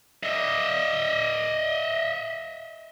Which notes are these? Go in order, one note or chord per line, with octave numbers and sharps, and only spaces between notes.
D#5 E5